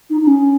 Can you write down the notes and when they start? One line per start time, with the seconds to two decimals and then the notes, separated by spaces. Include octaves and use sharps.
0.10 D#4
0.20 D#4
0.27 C#4